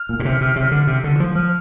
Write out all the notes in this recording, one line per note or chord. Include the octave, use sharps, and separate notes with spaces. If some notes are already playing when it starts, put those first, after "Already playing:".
Already playing: F6
A#2
A#2
C3
C3
C3
D3
C3
D3
F3
F3 F6